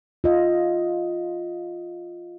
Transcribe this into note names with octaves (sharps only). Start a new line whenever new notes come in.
F4 D#5